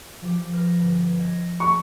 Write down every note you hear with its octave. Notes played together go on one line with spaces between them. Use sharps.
F3 G4
B4 F6 A#6
G1
D#5 G#6 A#6
C#6